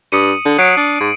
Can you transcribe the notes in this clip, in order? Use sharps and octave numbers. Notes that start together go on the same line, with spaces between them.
G2 D#6 C#7 D#7
D3
F#3 C7 D7
D4
G#2